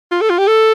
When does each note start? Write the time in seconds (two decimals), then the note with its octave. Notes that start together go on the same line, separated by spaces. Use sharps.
0.12 F4
0.21 A4
0.30 F4
0.38 G4
0.47 A4